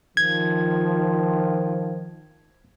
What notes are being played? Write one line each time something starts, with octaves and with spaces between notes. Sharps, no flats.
D#3 F3 G#6